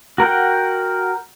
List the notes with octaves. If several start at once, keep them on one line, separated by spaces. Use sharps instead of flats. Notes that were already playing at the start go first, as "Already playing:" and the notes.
F#4 A#4 F#5 G5